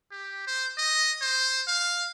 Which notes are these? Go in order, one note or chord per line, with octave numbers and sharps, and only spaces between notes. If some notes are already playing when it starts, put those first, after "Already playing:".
G4
C5
D#5
C5
F5